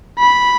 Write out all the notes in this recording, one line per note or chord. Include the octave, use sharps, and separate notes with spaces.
B5